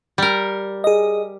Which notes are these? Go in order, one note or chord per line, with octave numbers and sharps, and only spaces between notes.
G3 A#4
G#4 D#5